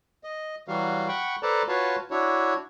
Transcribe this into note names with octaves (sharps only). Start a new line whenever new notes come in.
D#5
E3 F#3 G3 F#4 F5
F#5 G5 B5 C#6
A4 B4 C5 D5 A5 A#5
F4 F#4 B4 C#5 F5 A5
D4 E4 F#4 C#5